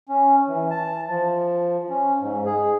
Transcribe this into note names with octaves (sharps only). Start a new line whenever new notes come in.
C#4
E3
A5
F3
C#4
G#2
G#4